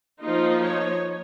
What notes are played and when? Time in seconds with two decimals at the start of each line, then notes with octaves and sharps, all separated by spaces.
0.21 F3 A#3 D#4 F4
0.63 C#5